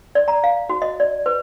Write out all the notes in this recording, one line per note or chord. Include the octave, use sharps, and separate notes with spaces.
D5
A#5
F5
F#4
D#5
D5
B4